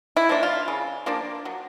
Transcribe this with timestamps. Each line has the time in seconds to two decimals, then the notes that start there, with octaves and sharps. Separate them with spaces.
0.17 E4
0.29 F3 A#3 D4
0.43 F4
0.68 C#3
1.06 F3 A#3 D4
1.45 F#3